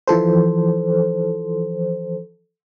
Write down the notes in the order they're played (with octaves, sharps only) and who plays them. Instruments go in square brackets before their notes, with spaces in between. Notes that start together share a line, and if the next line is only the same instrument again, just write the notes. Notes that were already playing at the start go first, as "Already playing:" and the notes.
[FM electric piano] E3 F3 A4 C5